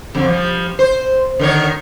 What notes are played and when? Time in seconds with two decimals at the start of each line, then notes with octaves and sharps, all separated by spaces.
0.15 F2 D3
0.28 F3 G3
0.79 C5
1.39 D3 D#3 C#5